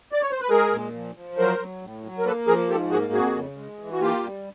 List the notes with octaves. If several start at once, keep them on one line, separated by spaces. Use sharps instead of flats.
D5
C#5
C5
B4
G#3 G#4 A#4
A#2
F3
F3
F#3 A#4 C5
F#3
A2
F#3
A#4
A#3 A4 B4
F3 G#4 A#4
G#2 G4 A4
A#3 F#4 G#4
F2 F#4 G#4
C#3
G#3
E3
F#4
A#3 F4 G4
G3